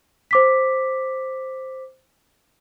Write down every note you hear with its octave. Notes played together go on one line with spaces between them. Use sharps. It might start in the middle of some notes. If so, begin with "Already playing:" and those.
C5 D6 B6